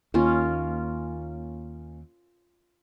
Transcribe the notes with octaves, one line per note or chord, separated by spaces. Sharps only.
D#2 A#3 C#4 F4